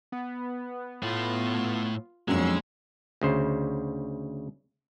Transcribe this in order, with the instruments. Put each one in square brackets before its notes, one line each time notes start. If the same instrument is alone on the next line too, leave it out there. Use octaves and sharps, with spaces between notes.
[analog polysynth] B3
[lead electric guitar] A2 A3 [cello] F4
[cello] F2 [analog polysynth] F#3 E6 [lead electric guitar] G#3 [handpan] A#3 C#4 D4
[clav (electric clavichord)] D2 C#3 C5